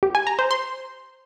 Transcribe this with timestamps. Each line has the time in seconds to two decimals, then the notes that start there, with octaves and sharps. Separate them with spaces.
0.03 G4
0.15 G#5
0.27 A#5
0.39 C5
0.51 C6